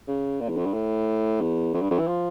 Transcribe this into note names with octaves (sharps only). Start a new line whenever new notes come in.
C#3
A#2
E2
F2
G2
A2
E2
F2
G2
F2
E3
F3